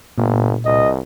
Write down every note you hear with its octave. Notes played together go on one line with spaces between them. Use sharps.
G1 A#2
C2 D#5